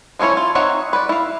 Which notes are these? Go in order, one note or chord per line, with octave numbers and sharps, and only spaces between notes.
F3 G#3 C#4 E4 C#5
F4
C4 D#4 C#5 E5 F#5
B4 D5
E4 F5